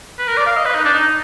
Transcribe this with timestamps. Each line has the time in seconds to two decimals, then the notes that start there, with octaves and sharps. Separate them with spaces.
0.19 B4
0.28 A#4
0.37 D5
0.46 F5
0.56 D#5
0.65 B4
0.75 D#4
0.85 D4
0.94 D#4